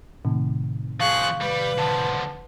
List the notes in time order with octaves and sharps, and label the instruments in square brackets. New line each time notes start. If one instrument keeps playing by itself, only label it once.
[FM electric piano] A2 C3 D#3
[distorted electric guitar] F3 G#4 [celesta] F5 [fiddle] C#6 F#6
[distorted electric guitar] G3 [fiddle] B4
[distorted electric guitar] D3 F3 [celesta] A5